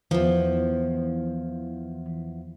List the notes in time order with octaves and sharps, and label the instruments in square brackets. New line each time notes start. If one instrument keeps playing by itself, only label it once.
[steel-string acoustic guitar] E2 F3 [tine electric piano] E3